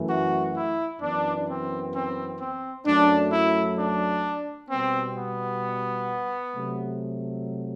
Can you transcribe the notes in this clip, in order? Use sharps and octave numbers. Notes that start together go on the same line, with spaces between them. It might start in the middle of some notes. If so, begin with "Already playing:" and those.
Already playing: F#2 E3 A3
F#4
E4
F#2 E3 B3 D4
C4
C4
C4
F#2 F#3 A3 D4
E4
D4
B2 G3 B3 C4
B3
C3 F#3 A3